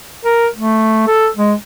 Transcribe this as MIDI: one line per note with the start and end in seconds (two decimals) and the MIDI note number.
0.25 0.47 70
0.55 1.06 57
1.07 1.27 69
1.36 1.53 56